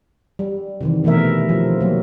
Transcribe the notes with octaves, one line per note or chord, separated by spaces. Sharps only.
G3
C3 D#3 E3
B2 E3 A3 A#4 E5
F3
F#3 A#3